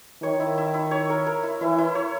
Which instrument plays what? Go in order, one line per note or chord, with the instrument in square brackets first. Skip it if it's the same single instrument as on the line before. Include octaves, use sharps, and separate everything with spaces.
[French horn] D#3 [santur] C#5
[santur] E4
E4
E4
C#5
A#4
A#4
E4
[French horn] E3 [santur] E4
[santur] E4
C#5